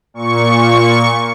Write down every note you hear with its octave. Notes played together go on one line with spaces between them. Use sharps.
A#2 C#6